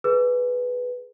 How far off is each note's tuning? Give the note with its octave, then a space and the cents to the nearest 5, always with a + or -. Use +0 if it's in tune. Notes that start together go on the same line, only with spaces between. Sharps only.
G#4 +20 B4 +0